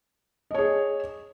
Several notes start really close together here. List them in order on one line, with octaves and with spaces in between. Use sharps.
D#5 C#5 G#4